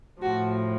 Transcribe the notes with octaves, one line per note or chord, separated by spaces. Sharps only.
A2 F3 F#4